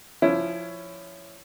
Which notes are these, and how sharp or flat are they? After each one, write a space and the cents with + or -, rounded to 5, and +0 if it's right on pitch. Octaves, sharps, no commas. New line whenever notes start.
F3 +0 C#4 +10 E4 +15